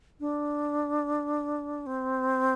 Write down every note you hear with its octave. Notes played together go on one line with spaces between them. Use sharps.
D4
C4